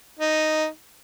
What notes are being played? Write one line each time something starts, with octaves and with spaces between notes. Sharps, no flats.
D#4